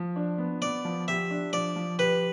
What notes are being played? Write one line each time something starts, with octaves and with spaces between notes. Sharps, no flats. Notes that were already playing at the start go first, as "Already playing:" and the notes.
Already playing: F3
D4
B3
B3 D5
F3
G4 E5
D4
F3 D5
F3
G4 B4